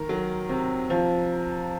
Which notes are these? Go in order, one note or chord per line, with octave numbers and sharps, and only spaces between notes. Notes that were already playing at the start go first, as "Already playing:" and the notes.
Already playing: D#3 A#4
F#3
C3
F3